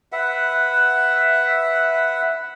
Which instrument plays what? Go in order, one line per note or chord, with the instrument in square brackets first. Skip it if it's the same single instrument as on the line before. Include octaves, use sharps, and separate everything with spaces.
[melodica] B4 E5 F#5